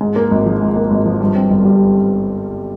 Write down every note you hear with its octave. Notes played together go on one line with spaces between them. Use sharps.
G#2
A#3
G#1
F3
G#2
A#3
G#1
F3
G2
C4
G1
G3